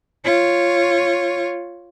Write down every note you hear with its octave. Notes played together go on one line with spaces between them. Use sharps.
F4 C#5